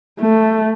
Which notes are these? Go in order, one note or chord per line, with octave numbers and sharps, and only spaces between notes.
A3